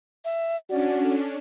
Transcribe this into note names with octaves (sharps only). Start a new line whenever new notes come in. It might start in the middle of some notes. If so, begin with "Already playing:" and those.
E5
C#4 D4 F#4 D5
A4